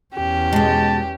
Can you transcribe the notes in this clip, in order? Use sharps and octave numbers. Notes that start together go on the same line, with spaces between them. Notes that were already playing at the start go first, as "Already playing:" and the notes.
E2 C#4 G4
B2 G#3 A5